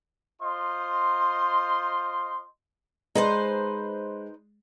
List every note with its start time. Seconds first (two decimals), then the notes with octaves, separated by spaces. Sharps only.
0.42 F4 C5 D#5 C6
3.16 G#3 D#4 B4 C5